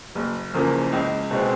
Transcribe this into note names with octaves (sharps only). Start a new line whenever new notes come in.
F#1
E2 C#3 F3 A#3
C#2
B2 G#3 C4